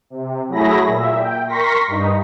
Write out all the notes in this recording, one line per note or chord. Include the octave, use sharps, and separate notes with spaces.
C3
F#3 A3 E4 G#4 B5 A#6
A#2 E5
G5
A#4 C6 C#6 A#6 B6
G2 D#4